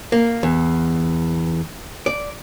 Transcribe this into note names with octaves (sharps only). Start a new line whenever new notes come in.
A#3
E2
D5